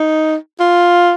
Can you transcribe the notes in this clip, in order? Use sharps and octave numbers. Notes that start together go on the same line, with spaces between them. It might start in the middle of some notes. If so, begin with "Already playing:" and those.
Already playing: D#4
F4